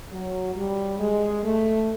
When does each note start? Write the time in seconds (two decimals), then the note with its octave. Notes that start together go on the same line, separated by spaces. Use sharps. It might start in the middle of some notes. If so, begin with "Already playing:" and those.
0.12 F#3
0.56 G3
1.00 G#3
1.44 A3